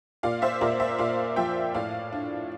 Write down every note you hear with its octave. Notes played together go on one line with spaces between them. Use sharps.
A#2 D5 F5
C5 E5
A#2 A#4 D5
C5 E5
A#2 D5 F5
F3 E5 G5
A2 D5 F5
D4